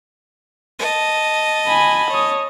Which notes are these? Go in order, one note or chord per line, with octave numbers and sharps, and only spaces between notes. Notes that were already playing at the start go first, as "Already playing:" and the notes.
D#5 A5
G#5 B5
C#5 D#6